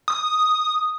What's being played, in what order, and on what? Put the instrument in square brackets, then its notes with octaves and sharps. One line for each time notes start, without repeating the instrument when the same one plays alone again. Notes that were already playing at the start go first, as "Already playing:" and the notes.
[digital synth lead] D#6